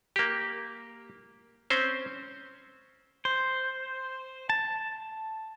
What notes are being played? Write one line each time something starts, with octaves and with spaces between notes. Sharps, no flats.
A#3 G4
C4 C#4 C5
C5
A5